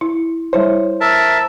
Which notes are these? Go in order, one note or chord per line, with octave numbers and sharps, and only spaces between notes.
E4
G3 E4 C5 C#5
A#4 E5 A5